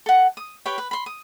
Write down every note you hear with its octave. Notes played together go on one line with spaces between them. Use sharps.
A4 F#5
D#6
G4 B4 C#5 G5
B4
B5 C6
D#6